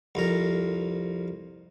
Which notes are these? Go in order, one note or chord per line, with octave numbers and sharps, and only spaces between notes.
C2 F2 A#4